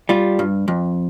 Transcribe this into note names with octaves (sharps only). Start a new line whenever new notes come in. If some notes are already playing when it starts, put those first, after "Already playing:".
G3 F4
G2
F2